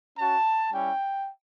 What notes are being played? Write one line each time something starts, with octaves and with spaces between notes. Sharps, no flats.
C#4 F#4 A5
G3 C#4 E4 G5